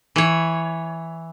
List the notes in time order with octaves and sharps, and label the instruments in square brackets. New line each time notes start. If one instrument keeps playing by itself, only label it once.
[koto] E3 C#5